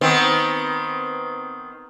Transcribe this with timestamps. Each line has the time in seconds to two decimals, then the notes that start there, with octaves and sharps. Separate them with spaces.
0.01 D#3 B3 C4